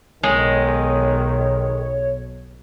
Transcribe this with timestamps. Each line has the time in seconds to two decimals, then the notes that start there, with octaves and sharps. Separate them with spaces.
0.23 B1 D#3 G#3 C#5